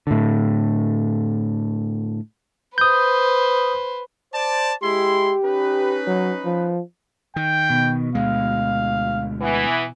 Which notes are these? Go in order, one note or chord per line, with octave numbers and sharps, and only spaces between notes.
A2 D3
B4 C5 D#6 G6
C5 D5 A5
G#3 E4 G4 C6
C#4 D#4 B4
F#3
F3
D#3 G5
B2
D2 G#3 F5
E3 B3